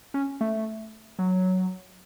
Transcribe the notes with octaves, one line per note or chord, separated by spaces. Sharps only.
C#4
A3
F#3